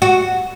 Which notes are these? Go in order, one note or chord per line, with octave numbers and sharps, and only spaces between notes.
F#4